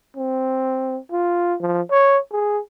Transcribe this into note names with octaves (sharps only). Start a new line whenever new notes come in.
C4
F4
F3
C#5
G#4